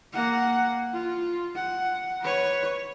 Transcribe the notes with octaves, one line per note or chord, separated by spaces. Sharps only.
A#3 F#5
F4
F#5
B4 C#5